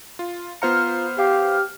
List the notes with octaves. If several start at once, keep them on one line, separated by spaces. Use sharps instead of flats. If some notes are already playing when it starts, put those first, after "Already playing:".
F4
B3 F4 C5 F5 A#5 F6 C#7
G4 F5